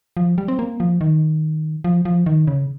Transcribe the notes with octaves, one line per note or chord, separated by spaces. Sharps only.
F3
G3
C4
A#3
F3
D#3
F3
F3
D#3
C#3